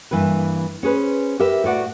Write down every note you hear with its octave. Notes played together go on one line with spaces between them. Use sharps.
G2 E3 A#3 B4
C#4 G#4 B4 C5
G4 A#4 B4 E5
A2 F#4 D5 F#5